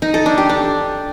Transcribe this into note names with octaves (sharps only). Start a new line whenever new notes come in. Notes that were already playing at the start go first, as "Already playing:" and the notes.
D#4
A4
D4
G4
D4